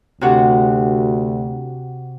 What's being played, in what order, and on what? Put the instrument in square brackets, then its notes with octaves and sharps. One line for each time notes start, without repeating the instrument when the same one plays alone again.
[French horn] D2 [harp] C3 F#4 F#5